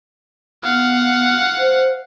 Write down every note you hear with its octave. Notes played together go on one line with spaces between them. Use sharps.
B3 F5 F#5
C5